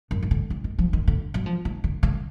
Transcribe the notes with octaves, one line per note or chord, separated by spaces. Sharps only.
F#2
D#3
D3
D3
D#3
F3
D#3
D3
F#3
F3
D#3
D3
D3